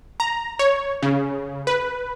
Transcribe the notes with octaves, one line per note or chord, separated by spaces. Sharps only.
A#5
C#5
C#3
B4